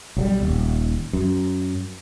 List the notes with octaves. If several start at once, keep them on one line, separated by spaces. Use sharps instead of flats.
B1 F#3 G3
D#1
F#2